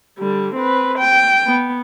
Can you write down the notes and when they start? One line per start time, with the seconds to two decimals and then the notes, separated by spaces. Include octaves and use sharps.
0.19 D3 G3
0.55 C4 B4
0.98 G5
1.47 B3